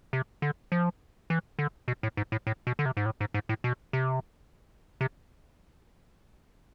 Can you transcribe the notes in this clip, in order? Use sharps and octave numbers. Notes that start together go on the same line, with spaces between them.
C3
D3
F3
E3
D3
B2
A2
G#2
A2
A2
B2
D3
C3
G#2
A2
G#2
G#2
A2
B2
C3
C3